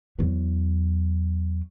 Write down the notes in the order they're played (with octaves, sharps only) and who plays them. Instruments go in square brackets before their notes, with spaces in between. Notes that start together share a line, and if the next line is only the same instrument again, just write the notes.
[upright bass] E2 F#3